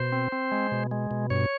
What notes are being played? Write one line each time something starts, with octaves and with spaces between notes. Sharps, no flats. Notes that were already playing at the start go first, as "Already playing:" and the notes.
Already playing: B2 C5
C4
C4
G#3
B2
G#3
B2
G2 C#5